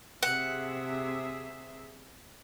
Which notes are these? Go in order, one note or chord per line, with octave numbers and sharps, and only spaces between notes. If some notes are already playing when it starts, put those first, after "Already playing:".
C3 G#4 E5 F#5